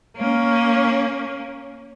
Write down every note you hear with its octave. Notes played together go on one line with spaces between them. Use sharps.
A#3 C#4